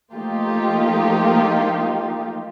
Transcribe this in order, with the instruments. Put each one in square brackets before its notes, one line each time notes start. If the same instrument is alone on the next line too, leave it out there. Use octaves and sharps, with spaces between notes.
[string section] F3 A3 A#3 D#4 F4 G4